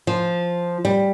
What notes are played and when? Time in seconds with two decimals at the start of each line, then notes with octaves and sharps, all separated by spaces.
0.07 F3
0.85 G3